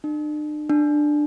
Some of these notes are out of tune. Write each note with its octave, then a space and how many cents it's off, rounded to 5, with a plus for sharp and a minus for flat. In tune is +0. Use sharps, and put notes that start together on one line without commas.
D4 +45
D4 +15